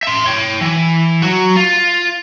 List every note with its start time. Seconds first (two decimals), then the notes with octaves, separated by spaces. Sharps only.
0.03 E5 C6
0.26 C#5 G5
0.61 E3
1.22 F#3 F#4
1.56 F4